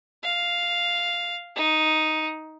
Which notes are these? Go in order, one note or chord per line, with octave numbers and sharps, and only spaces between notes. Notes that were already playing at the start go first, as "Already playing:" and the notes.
F5
D#4